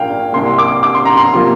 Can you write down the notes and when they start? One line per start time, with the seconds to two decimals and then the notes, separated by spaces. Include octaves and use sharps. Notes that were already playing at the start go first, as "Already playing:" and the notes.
Already playing: A#1 A#2 A#3 F5 G5
0.33 C2 C3 A#3 C6
0.58 D6
0.83 D6
0.95 C6
1.05 A#5
1.17 C6
1.33 C3 F3 A#3